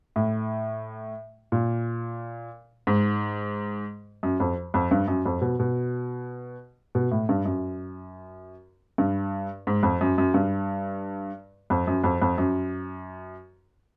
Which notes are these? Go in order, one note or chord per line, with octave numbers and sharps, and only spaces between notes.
A2
A#2
G#2
F#2
F2
F2
G2
F#2
F2
B2
B2
B2
A2
G2
F#2
G2
G#2
F2
F#2
F#2
G2
F2
F#2
F2
F2
F#2